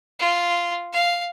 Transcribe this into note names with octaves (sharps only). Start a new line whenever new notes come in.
F4
F5